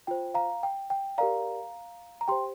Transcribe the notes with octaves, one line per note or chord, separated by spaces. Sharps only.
F4 C5 G5
F5 A#5
G5
G5
G4 A#4 D5 F5 A#5
A#5
G4 C5 G5 C6